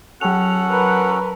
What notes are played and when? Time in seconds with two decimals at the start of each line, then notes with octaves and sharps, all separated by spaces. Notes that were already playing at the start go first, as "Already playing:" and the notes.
0.21 F#3 C#4 F#4 A4 F#5 F7
0.69 A#4 B4